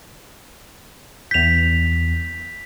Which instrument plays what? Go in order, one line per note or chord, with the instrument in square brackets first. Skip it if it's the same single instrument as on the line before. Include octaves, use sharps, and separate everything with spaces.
[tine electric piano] E2 G6 [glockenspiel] B6 F7